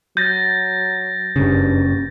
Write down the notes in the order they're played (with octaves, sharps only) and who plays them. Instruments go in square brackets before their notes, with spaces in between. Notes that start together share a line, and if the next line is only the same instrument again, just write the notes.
[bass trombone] F#3 [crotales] G6 A6 A#6
[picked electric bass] F#1 C#3 [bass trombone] G2